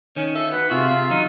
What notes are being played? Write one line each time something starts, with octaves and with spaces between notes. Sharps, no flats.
D#3 C#4
F4 A4 E5
D2 B3 B4 F#5
C3 F4 F#4 G#4 E5 F5
C3
D#3 F#3 D#4